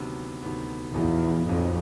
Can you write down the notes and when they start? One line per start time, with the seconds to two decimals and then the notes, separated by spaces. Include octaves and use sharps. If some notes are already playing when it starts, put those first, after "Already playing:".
Already playing: D2 C3 D#3 F#3 B3
0.43 D2 C3 D#3 F#3 B3
0.94 A#1 E2 A#2 F#3 B3 D#4
1.47 A#1 F2 A#2 F#3 B3 D#4